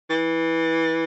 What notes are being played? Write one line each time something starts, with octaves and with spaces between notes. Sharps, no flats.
E3